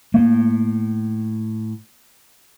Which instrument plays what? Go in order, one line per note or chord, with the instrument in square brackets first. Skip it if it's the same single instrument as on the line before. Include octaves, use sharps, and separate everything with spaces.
[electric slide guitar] A2 [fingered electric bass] A#3